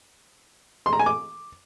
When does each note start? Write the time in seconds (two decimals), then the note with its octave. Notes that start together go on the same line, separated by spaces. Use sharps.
0.86 C6
0.93 A#5
0.99 G#5
1.06 D6